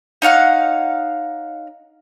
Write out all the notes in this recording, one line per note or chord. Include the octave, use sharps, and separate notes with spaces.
D#4 C#5 F5 F#5